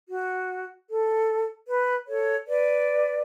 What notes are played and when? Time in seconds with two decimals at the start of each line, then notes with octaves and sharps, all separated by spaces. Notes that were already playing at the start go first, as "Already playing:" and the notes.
0.09 F#4
0.89 A4
1.68 B4
2.07 A4 C#5
2.46 B4 D5